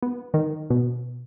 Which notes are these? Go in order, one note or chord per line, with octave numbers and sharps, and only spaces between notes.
B3
D#3
B2